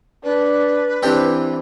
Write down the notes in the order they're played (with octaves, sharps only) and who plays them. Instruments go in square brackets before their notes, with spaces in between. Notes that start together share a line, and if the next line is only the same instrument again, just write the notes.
[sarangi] D4 [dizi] B4
[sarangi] E3 [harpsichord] C4 D4 G4